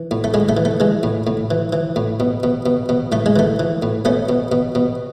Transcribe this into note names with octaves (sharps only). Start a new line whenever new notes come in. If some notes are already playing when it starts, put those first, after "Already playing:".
Already playing: E3
A2
A3
A2 G#3
A3
E3
A3
E3 G#3
A2
A2
E3
E3
A2
B2
B2
B2
B2
A2 A3
G#3
E3 A3
E3
A2
B2 A3 C#4
B2
B2
B2